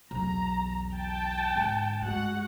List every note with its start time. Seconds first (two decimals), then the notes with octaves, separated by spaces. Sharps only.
0.11 B1 E2 A#5
0.94 G5 A5
1.56 G#2 D3
2.02 G2 G#3 F#4 F#5